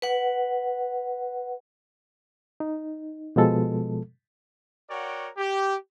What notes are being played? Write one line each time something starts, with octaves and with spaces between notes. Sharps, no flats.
B4 F#5
D#4
B2 F3 G#3 A4
F#4 A#4 C#5 D5 F#5 G5
G4